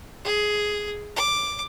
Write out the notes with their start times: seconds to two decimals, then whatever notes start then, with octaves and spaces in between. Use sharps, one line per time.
0.25 G#4
1.16 D6